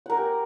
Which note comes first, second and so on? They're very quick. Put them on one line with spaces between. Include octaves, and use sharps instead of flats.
F#5 A#4 G#5 G4